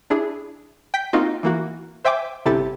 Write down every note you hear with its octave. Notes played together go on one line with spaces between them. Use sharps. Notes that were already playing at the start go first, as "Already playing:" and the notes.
D4 E4 G#4
G5 B6
A#3 C4 D#4 F4 F#4
E3 A#3 F#4
C5 E5 G5 G#5 D6
G1 C3 E4 G4 A4 A6